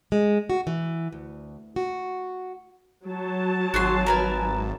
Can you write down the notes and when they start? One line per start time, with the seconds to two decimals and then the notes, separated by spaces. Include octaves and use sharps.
0.12 G#3
0.50 F#4
0.67 E3
1.12 D2
1.76 F#4
3.06 F#3 A5
3.74 G#1 F#4 G#4 C6
4.06 A#4 B4 G#5